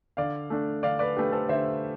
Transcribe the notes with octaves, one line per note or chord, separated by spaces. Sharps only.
D3 D5 F5
A3 D4
D3 D5 F5
B4 D5
A3 D4 G4 B4
A4 C5
D3 C5 E5